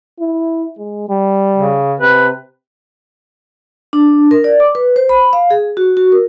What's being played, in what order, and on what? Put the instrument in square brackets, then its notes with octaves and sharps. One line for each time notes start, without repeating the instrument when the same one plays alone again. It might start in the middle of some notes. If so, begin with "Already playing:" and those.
[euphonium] E4
G#3
G3
[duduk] C#3
[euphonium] C3 [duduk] B4
[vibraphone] D4
A#4
D5
D6
B4
C5
B5
F5
G#4
F#4
F#4
A#4